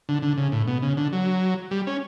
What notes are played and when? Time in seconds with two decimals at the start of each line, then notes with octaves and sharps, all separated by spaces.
0.09 D3
0.22 D3
0.38 C#3
0.52 A2
0.68 B2
0.83 C#3
0.97 D3
1.13 F#3
1.71 G3
1.87 C#4